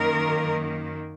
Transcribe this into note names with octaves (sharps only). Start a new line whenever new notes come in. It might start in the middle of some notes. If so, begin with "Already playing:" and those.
Already playing: F#2 D#3 A#3 A#4